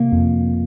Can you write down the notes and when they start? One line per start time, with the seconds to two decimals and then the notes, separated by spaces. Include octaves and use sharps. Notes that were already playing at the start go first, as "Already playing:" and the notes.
Already playing: C3 A#3
0.12 F2